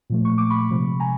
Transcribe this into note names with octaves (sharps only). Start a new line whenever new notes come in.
A#2 F3 A3
C#6
D6
B5 C#6
C3 F3 G#3
G#5 A#5